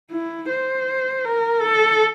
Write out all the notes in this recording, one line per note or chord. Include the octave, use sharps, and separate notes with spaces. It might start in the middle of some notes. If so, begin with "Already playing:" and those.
E4
C5
A#4
A4